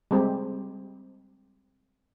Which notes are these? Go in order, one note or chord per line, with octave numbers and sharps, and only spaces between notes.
G3 G#3 C4 G4